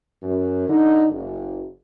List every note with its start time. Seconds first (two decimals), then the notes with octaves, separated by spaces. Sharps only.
0.23 F#2
0.68 D3 D#4
1.10 F#1